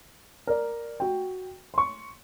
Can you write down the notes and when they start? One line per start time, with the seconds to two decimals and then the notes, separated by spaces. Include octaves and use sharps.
0.47 A#4 D5
1.00 F#4 G5
1.74 C6 C#6